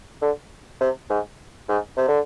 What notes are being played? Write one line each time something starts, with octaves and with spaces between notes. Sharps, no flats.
D3
C3
G#2
G#2
C3
D3